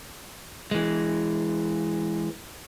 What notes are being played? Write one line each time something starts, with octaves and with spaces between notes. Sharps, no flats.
E3 G#3